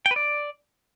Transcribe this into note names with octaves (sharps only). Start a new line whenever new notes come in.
G5
B4
D5